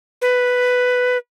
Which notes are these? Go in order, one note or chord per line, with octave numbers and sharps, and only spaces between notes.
B4